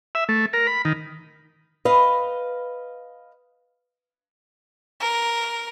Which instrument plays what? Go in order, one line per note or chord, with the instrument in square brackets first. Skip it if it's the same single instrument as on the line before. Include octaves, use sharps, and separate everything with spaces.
[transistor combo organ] E5
A3
A#4
B5
D#3
[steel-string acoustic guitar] B4 D#5 F5
[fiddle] A#4